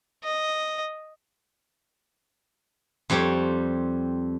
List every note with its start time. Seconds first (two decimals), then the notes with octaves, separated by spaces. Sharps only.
0.24 D#5
3.10 F2 G3 C4 G4 C#5